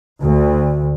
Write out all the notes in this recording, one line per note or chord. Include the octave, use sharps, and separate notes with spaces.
D2